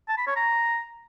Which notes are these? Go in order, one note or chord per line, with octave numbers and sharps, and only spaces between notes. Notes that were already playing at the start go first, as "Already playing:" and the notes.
A5
B5
C#5
A#5